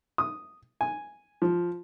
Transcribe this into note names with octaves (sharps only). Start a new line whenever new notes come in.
D#6
G#5
F3